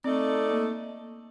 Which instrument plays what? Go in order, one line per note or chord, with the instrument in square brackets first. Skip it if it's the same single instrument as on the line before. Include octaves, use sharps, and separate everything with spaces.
[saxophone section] A3 D#4 A4 D5 [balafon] C4
[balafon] A#3